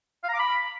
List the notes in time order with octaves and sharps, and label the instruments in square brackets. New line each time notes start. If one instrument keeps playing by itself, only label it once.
[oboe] F5
A#5
D6
B5